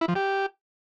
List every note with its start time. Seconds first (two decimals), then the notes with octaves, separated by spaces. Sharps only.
0.01 E4
0.08 F3
0.15 G4